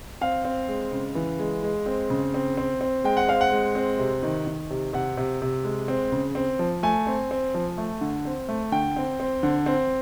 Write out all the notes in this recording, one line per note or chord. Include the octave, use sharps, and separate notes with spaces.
C4 F5
C4
G#3
C#3
E3
G#3
G#3
C4
C#3
C4
C4
C4
G#3 G5
F#5
C4 F5
F#5
G#3
C4
C3
D#3
D#3
C3
C3 F#5
C3
C3
G#3
C4
C#3
C4
F3
A3 G#5
C4
C4
F3
A3
D3
C4
A3
D3 G5
C4
C4
D3
C4